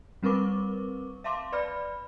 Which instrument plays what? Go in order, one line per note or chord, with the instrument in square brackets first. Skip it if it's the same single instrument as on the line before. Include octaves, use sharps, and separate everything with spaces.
[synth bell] G3 C4 A#4 B4 C#6 D6
E5 F5 A5 C6 D6
B4 D5 B5 F6